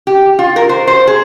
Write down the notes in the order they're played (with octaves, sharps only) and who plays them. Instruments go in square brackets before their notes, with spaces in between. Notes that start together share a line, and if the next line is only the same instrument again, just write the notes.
[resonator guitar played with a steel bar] G4
F4
A#4
C5
C5
G#4